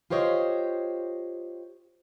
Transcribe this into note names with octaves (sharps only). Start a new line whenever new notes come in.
F4 G4 C5 C#5 D#5